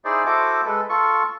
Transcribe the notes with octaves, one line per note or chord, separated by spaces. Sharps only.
D#4 E4 G#4 C5 D5
E4 F#4 A4 C5 D6
G#3 A4 B4
F4 A4 C#6